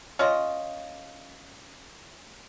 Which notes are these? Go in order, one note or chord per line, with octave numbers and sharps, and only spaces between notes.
C#4 F4 D#5